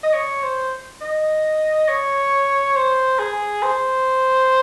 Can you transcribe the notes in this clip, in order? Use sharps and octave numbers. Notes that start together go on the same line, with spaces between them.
D#5
C#5
C5
D#5
C#5
C5
G#4
C5